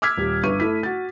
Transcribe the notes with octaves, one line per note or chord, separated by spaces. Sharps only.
D6 E6 F6 G#6 B6
D#1 G4
G1 G2 B4 C#6 D#7
A3 E4 B6
F#4 A6